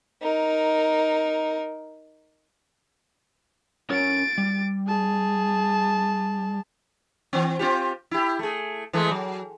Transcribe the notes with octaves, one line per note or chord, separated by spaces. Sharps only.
D#4 A#4
C#4 A#4 C#5 A6 D7
G3
G#4 A5
E3 C4
C4 F4 G4
E4 G4
A3 G#4
E3 G#3 A3
F#3